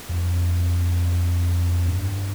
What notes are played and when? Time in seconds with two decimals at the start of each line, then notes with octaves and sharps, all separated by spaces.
0.09 F2
1.88 G2